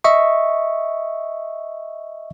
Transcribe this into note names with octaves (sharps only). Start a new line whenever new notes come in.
D#5 E5 C#6